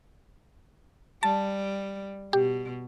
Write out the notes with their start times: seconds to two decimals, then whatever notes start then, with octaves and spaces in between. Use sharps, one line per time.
1.23 G3 A5
2.33 B2 G4